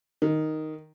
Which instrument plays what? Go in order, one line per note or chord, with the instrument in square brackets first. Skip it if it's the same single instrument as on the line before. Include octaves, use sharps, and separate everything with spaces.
[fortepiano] D#3